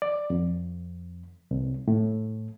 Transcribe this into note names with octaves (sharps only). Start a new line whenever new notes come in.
D5
F2
C2
A2